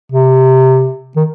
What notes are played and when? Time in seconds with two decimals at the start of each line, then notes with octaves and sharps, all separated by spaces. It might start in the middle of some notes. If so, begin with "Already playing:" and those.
0.12 C3
1.16 D#3